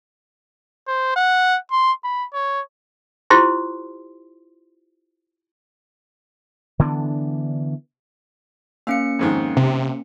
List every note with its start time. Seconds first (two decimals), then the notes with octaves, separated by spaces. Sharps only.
0.87 C5
1.16 F#5
1.71 C6
2.04 B5
2.33 C#5
3.30 E4 F4 G4 C5 C6
6.79 D3 E3 B3 D4
8.87 A#3 C#4 F5 C#7
9.19 F2 G#2 D#3
9.57 C3